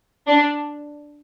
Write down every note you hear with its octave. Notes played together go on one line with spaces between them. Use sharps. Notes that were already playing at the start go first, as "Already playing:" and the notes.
D4